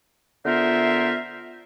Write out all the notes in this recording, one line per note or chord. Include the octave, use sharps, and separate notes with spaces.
D3 B3 F4 A#4 C5 E5